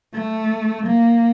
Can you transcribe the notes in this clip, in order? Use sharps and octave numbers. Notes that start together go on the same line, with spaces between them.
A3
A#3